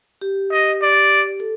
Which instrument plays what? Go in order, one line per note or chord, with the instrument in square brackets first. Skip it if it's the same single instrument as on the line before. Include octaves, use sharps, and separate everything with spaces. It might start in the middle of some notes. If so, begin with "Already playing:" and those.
[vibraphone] G4
[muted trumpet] D#5
D5
[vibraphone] A4